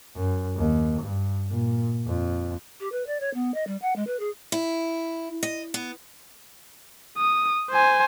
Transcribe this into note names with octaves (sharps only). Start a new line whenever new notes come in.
F#2
D#2
G2
A#2
F2
G4
B4
D5
C#5
B3
D#5
G3
F#5
G#3
B4
G#4
E4
D#5
B3
D#6
C5 G#5